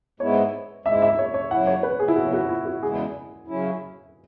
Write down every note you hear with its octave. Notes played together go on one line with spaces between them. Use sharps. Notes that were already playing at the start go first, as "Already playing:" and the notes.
G#2 G#3 B3 E4 C#5
G#2 G#3 E4 E5
E5
C#5
C#5
F#2 C#3 F#3 E4 F#5
C#5
B4
G#4
E4
F#2 C#3 F#3 B3 F#4
F#4
E4
F#4
E2 C#3 G#3 B3 E4 G#4
C#3 F#3 C#4 E4